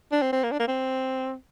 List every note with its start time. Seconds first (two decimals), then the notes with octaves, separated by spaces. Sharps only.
0.12 D4
0.22 C4
0.32 C4
0.43 A#3
0.51 D4
0.59 A#3
0.68 C4